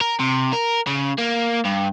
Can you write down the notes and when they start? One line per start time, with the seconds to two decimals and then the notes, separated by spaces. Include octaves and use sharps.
0.01 A#4
0.20 C3
0.53 A#4
0.87 C#3
1.18 A#3
1.65 G2